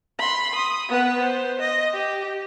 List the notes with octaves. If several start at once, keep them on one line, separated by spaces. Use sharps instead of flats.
B5 C6
D#6
B3 B4
C5
D#5
G4